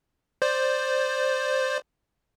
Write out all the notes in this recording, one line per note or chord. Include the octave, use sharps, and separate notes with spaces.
C5 D5